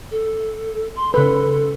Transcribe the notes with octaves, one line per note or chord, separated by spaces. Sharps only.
A4
C6
C#3 A4 B4